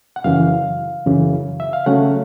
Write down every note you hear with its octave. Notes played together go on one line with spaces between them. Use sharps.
F#5
F#2 C#3 E3 F5
F#2 C#3 E3
E5
F5
C#3 F#3 A3 C#4 F#5